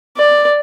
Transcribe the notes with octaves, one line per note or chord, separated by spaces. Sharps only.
D5